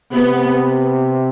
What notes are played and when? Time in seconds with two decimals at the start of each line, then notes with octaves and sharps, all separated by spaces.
0.13 C3 B3